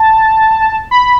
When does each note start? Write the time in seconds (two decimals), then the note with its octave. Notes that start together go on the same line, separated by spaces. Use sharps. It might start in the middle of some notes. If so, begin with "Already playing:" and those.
Already playing: A5
0.91 B5